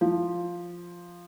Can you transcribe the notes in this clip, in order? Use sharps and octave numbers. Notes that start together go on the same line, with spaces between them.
F3